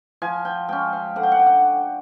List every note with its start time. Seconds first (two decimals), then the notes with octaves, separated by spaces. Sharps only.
0.22 F3 G#5
0.45 G5
0.68 G#3 C#4 G5
0.93 F5
1.16 D3 F#5
1.23 G5
1.32 F#5
1.39 G5
1.46 F#5